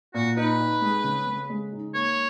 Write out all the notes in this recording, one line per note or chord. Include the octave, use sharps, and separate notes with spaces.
A#2 F#4
D#4 B4
D#4
G#3
C#3
C#3
G#3
D#4
A#3 C#5